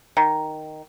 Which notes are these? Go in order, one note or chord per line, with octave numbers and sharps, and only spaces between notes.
D#3